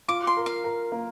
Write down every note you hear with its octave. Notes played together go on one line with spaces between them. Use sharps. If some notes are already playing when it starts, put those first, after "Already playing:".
F4 D6
C6
A#4
F5
A#4
A#3